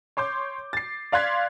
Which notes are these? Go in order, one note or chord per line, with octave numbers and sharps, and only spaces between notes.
C#5 C6 D6 G6
A6 C7
D5 F5 C6 F#6 G#6 B6